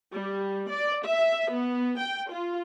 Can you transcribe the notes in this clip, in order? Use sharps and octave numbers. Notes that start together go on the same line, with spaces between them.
G3
D5
E5
B3
G5
F4